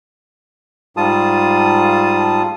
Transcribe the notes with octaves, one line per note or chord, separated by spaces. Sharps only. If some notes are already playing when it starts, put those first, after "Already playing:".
G#2 G3 F4 A5 D#6